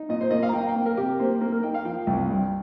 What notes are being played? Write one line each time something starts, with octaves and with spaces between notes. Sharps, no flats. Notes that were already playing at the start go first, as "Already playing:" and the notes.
Already playing: D#4
A#2 D#5
C5
A#3 D#5
F5
A#5
A#3 G5
G5
A#3
A#4
C3 G4
A#3 C5
A#3 A#4
A#4
D#4 G5
F5
F3 G5
C2 G5
G2